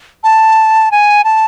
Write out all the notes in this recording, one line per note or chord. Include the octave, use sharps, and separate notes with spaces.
A5
G#5
A5